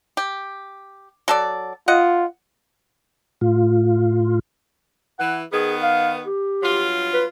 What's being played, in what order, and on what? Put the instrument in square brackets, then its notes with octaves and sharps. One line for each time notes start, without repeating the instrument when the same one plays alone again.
[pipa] G4
F#3 A4 D5
[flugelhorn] F4 [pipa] D#5 F#5
[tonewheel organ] A2 F4
[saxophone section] E3 [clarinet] F#5
[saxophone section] D#3 B3 [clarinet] G#4
[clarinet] F5
G4
[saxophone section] G2 F#3 F4
[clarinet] B4